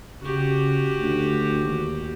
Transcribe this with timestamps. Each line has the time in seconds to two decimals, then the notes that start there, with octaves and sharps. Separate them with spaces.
0.21 C#3 F#4 G4
0.98 D2
1.60 D#2